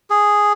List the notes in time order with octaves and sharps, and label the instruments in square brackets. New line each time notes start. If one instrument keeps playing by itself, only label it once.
[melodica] G#4